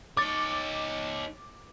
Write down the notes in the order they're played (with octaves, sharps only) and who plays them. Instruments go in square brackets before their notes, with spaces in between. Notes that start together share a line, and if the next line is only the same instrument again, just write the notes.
[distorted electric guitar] D#4 C#5 [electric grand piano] D6 A6